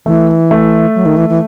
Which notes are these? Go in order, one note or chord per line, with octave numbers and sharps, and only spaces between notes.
E3 A3
A3
F#3
D#3
E3
E3